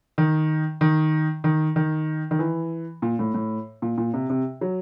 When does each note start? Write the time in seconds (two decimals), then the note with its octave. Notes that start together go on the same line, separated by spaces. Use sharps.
0.18 D#3
0.81 D#3
1.44 D#3
1.76 D#3
2.31 D#3
2.39 E3
3.02 A#2
3.19 A2
3.34 A2
3.82 A#2
3.98 A#2
4.14 C3
4.30 C3
4.61 F#3